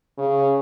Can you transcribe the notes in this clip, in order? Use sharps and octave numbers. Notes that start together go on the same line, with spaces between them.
C#3